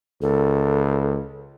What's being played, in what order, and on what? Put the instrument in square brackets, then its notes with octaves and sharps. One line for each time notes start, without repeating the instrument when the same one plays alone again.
[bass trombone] C#2 [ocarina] A4